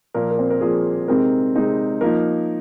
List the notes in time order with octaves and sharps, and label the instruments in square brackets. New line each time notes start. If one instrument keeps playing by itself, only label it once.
[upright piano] A#2 F3 A#3 A#4
A#4
C4 C5
A#4
A#2 F3 A#3 G#4
C3 G#3 C4 D#4 A#4
C3 G#3 C4 D#4
F3 A#3 D#4 A#4